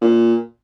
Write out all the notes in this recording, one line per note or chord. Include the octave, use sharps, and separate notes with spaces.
A#2